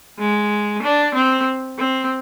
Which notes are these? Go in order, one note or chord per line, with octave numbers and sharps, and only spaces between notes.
G#3
D4
C4
C4